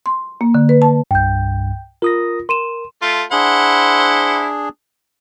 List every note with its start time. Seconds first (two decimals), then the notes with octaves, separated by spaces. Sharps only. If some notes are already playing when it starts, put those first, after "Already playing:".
0.06 C6
0.41 A#3
0.54 D3
0.69 B4
0.82 A5
1.11 C2 G2 G5 G6
2.02 F4 A#4 D#6 A#6
2.49 A#4 C6 D#7 E7
3.02 A3 F4
3.32 D4 E4 G#4 C5 F#5